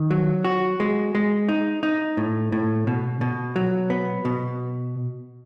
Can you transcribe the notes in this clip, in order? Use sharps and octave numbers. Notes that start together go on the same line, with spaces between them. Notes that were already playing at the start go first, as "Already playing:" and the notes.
Already playing: D#3
F#3
F#4
G#3
G#3
D#4
D#4
A2
A2
B2
B2
F#3
B3
B2